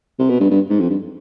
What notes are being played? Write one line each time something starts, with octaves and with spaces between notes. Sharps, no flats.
C3
B2
G2
G2
G#2
F2
G2